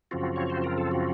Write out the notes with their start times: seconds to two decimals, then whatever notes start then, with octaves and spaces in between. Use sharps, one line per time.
0.11 F#2 C#3 F3 C4 F4 F#4
0.36 C#5
0.50 C5
0.64 A#4
0.78 A4
0.91 F#4